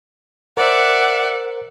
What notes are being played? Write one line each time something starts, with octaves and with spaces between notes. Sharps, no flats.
A#4 C5 D5 E5 F#5